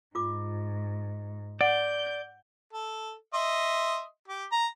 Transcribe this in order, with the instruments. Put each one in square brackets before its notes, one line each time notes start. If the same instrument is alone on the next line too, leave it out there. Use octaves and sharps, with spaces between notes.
[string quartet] G#2 [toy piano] F4 D6
[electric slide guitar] D5 [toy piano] F#5 [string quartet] G6
[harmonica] A4
D#5 E5 C6
G4
A#5